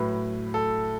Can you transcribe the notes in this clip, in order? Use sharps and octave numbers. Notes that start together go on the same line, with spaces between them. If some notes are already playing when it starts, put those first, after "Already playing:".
Already playing: A2 F#3 B4
A4